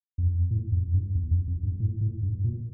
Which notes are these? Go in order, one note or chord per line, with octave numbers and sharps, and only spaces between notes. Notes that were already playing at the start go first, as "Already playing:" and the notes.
F2
A2
F2
G2
E2
F2
F2
G2
A2
A2
G2
A#2